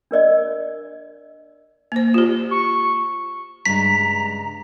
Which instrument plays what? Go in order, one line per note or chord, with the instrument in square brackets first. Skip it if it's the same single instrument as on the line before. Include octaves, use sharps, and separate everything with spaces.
[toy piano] D4 A#4 D5 D#5
[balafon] A#3 C5
F4 G4
[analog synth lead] C#6
[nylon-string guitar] G2 C#3 G#3 [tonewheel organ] A#5 [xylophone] B6